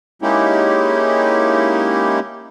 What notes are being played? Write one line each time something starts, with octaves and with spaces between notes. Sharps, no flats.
G#3 A#3 C#4 D#4 E4 G4